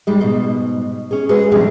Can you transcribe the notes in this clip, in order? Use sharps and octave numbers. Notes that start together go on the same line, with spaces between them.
G#2 G3 G#3
G#2 B2
C#4 G#4
G#3 F#4 G#4 B4 C5
A2 C3 F3 G3 D4 G#4